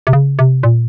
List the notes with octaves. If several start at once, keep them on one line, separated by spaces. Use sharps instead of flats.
C3
C#3
C3
A#2